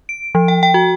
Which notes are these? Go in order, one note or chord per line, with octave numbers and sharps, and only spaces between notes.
D7
F3
G5
G5
F#4